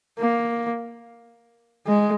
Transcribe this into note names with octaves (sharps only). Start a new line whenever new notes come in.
A#3
G#3